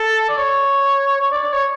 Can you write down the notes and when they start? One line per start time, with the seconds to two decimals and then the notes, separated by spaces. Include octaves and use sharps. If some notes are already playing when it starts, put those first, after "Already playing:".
Already playing: A4
0.29 D5
0.38 C#5
1.21 C#5
1.32 D5
1.43 D5
1.53 C#5